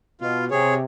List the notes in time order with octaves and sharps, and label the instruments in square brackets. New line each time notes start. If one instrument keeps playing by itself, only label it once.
[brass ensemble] B2 [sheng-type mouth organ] F4
[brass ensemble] C3 [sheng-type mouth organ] G#4 C#5